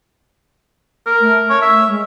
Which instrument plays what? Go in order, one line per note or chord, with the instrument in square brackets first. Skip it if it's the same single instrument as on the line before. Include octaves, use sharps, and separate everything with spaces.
[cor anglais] A#4
[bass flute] A3
[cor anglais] C#5
E5
[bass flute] G#3